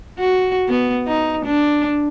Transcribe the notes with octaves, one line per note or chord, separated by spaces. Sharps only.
F#4
B3
D#4
D4